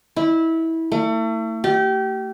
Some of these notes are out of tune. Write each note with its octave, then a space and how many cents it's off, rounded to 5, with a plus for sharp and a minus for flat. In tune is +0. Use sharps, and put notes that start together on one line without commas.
E4 -20
A3 +35
G4 -25